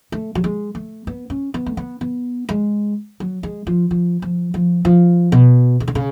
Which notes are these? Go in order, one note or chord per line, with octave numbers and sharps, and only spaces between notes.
A3
F#3
G#3
A3
B3
C#4
B3
A3
B3
B3
G#3
F#3
G#3
F3
F3
F3
F3
F3
B2
C#3
D3
C#3